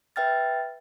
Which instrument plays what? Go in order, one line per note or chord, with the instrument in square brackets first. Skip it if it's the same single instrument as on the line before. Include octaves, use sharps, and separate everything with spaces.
[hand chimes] B4 E5 G5 F6 A6